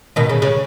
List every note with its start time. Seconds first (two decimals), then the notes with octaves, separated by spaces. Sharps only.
0.16 B2 D#3
0.29 C#3
0.42 C#3